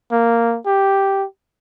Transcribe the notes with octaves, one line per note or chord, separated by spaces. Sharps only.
A#3
G4